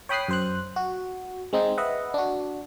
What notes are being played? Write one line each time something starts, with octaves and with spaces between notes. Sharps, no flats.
C#5 G5 B5 D#6 F#6 C7
F#2 C5 F#6
F#4
G#3 C4 D#4
B4 D#5 E5 F#5
D4 F#4